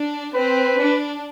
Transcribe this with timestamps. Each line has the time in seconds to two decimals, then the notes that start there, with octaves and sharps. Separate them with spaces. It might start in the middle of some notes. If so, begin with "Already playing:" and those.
Already playing: D4
0.34 C4 B4
0.78 D4